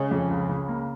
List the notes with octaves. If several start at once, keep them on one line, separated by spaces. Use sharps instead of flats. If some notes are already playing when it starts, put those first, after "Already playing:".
Already playing: C#3 G#3
F2
C#2
C#3
A#3